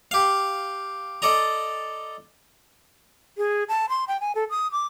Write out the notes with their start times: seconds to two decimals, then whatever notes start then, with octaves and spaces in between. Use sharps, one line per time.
0.11 G4 F5
1.22 A4 D5 D#5 A#5
3.38 G#4
3.69 A5
3.89 C6
4.08 G5
4.21 G#5
4.35 A4
4.50 D#6
4.72 D6